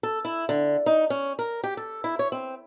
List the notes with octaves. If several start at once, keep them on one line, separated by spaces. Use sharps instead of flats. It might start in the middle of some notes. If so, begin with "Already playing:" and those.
A4
E4
D3
D#4
C#4
A#4
G4
A4
E4
C#5
C4